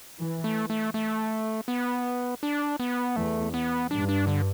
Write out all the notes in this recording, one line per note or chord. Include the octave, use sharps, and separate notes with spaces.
E3
A3
A3
A3
B3
D4
B3
E2 A3
B3
G2 D4
D4
D3